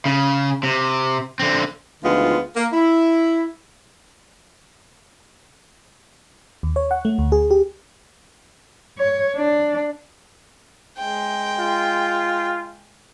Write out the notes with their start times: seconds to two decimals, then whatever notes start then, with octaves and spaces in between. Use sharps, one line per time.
0.05 C#3
0.63 C3
1.40 D3 C4
2.03 D2 D#3 F3 G#3 B3 F4
2.56 A#3
2.73 E4
6.63 D#2
6.76 C#5
6.91 F#5
7.05 A3
7.19 D2
7.32 G#4
7.51 G4
8.98 C#5
9.36 D4
10.98 G#3 G5
11.59 F4